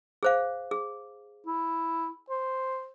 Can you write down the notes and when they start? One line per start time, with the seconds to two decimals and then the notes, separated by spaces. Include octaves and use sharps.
0.23 G#4 C5 F5
0.71 G#4
1.47 E4
2.30 C5